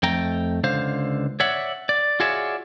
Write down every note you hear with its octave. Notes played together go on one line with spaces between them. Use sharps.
F2 A3 G5 A#5
C#2 D3 C5 F5
C#5 D5 E5 F#5
D5
F4 F#4 G#4 C#5 D5 E5